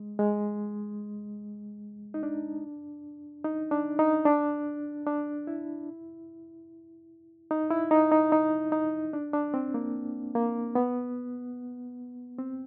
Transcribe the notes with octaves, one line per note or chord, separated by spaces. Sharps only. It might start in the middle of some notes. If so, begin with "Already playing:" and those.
Already playing: G#3
G#3
D#4
D4
D#4
D4
D#4
D4
D4
E4
D#4
E4
D#4
D#4
D#4
D#4
D4
D4
C4
A#3
A#3
B3
C4